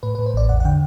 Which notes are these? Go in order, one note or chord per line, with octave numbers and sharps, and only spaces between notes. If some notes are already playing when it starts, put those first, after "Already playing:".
A2 B4
A2 B4
C5
A1 D5
E2 F#5
F#5
D3 G5